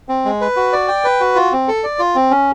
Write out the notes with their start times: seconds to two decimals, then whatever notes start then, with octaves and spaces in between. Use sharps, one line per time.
0.09 C4
0.25 G#3
0.41 B4
0.56 F#4
0.73 D5
0.88 G5
1.05 B4
1.20 F#4
1.35 F4
1.52 C4
1.68 A4
1.84 D5
1.99 F4
2.15 C4
2.31 C#4